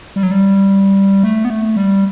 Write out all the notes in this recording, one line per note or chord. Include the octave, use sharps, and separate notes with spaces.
G3
F#3
G3
A3
B3
A3
G3